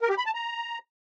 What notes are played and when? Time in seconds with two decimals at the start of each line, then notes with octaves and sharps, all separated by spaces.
0.01 A#4
0.09 G4
0.18 B5
0.26 A5
0.34 A#5